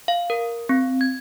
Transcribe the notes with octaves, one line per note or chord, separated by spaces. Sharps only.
F5
A#4
C4
G#6